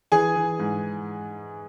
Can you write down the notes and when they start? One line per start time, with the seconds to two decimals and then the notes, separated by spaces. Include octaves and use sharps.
0.12 E3 G#4 G#5
0.36 E3
0.60 G#2